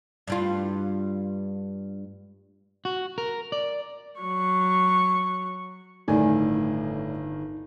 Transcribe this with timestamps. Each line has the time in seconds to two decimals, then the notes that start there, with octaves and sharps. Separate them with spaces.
0.28 G2 G3 F4
2.85 F#4
3.18 A#4
3.52 D5
4.21 F#3 C#6
6.08 G1 A2 D#3 D#4 D5 G#5